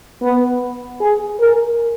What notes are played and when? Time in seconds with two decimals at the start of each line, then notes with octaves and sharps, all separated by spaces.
0.22 B3
1.01 G#4
1.40 A#4